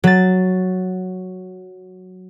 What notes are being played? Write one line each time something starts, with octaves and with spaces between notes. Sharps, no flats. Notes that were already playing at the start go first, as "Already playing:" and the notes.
F#3 A6